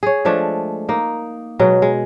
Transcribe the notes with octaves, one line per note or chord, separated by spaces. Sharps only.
G#4 C#5
F3 G#3 A3 D4
A#3 D#4
B2 F#3 G#3
G#3